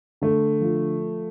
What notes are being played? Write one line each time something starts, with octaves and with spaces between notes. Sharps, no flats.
D3 A3
F3